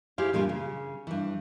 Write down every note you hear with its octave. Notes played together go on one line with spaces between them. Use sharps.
E4 G4 G#4 C5 F5
G2 A#2 E3
C#3
G2 E3